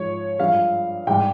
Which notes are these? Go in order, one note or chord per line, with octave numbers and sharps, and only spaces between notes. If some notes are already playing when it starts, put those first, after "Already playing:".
Already playing: G#2 F3 G#3 C#5
G2 F3 G#3 F5
G#2 G3 G5